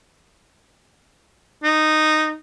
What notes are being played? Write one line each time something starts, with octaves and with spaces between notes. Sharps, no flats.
D#4